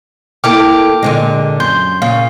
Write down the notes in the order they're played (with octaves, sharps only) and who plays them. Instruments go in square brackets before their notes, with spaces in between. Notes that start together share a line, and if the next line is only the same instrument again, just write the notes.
[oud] A#3 E4 A4 [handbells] G5 D6 F6
[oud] A#2 D3 G#3
[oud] F#2 [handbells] C6 G6
[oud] A#2 C#3 [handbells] F5